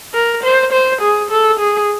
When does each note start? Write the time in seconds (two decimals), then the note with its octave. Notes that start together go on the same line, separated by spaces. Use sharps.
0.14 A#4
0.43 C5
0.72 C5
1.01 G#4
1.30 A4
1.60 G#4